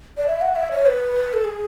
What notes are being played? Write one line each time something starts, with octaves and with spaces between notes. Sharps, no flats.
D5
E5
F#5
E5
C#5
B4
A4
G#4